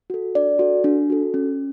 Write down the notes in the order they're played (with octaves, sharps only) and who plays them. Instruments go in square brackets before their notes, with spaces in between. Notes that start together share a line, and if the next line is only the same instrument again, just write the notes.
[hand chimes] F#4 A4
D4 D5
F#4 A4
D4
F#4 A4
C#4